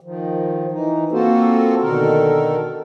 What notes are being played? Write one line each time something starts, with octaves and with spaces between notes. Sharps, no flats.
D#3 F3
E3 D#4
A#3 C4 F4 F#4 A4 C5
B2 D3 D#3 A4 A#4